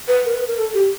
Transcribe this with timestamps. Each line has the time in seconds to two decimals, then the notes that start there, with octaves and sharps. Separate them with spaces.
0.08 B4
0.26 A#4
0.33 B4
0.48 A#4
0.58 A4
0.74 G4